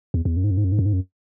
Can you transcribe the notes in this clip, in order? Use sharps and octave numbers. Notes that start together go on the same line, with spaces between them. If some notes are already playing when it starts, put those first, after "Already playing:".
E2
E2
F#2
G#2
F#2
G#2
F#2
G#2
F#2
G#2
F#2